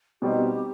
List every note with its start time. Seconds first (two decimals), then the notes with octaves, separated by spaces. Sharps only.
0.22 B2 G3 C4 D#4 G4